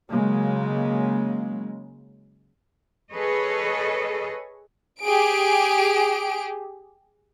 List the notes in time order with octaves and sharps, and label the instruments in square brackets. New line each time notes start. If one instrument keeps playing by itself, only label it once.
[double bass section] C#3 F#3 G#3 A#3
[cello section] G#4 A4 B4 C#5 D#5
[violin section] G4 G#4 D7